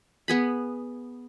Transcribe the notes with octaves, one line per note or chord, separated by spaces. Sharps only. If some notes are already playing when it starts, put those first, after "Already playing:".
B3 G#4 B5